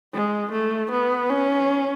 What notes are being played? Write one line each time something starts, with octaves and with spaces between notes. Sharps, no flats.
G#3
A3
B3
C#4